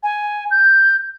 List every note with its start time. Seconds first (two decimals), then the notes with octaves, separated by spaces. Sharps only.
0.03 G#5
0.51 G6